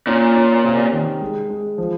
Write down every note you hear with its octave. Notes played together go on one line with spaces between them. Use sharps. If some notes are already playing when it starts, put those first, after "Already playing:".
A#2 C#4
C#4
C3
D#3
G#3
G#3
F3